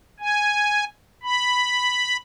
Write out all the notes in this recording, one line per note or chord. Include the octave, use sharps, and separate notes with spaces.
G#5
B5